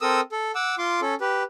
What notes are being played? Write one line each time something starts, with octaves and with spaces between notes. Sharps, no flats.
C4 A4 A#4 D#6 E6
A4
F#5 D6 E6
F4 C6 D6
C#4 A4
G4 B4